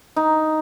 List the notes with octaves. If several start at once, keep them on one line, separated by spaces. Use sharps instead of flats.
D#4